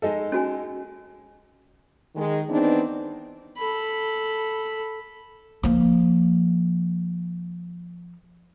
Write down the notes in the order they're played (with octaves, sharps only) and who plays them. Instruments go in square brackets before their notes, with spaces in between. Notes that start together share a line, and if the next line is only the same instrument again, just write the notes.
[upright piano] G#3 D#4 A4
[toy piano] C#4 F#4 G#5
[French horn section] D#3 G#3
E3 B3 C4 D4 D#4
[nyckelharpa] A4 B5
[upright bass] F3 A#3